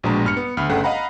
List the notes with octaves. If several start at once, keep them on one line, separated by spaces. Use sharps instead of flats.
A#1 B2 G#3 D4 A#5
G2 F6 C#7
B3
D2 B5 F6
G1 C#3 A3 F#5 G5 F#6
D#5 F5 F#5 A#5 B5